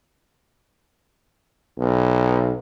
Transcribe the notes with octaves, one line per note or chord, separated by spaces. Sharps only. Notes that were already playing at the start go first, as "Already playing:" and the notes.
B1